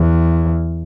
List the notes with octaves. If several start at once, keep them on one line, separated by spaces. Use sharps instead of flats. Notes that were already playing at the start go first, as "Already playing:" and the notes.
Already playing: E2